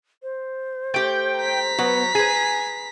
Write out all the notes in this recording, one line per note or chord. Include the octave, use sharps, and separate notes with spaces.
C5
A3 G4 G5
A#5 B6
F#3 B3
G#4 B4 G#5